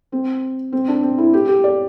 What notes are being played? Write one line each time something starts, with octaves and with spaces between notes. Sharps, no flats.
C4
C4
D4
C4
E4
G4
G4
D5